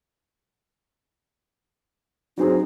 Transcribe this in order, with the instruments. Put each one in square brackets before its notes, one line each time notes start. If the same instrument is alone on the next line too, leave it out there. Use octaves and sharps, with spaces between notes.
[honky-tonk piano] F#3 C4 G#4 [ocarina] D#4